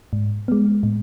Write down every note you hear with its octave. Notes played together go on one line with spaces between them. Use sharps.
G#2
G#3 B3
A2